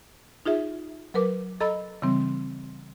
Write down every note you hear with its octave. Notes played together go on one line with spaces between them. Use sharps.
D#4 F4 G#4 E5
F#3 A#4 B4 D6
A4 D#5 A#5 B5 E6
C#3 E3 G3 C4